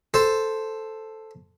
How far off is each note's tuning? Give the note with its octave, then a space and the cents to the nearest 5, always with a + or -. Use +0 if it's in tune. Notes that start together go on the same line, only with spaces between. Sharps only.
A4 +0 C5 +0